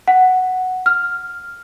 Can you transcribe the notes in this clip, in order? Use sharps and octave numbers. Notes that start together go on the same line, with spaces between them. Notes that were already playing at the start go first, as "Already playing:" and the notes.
F#5
F6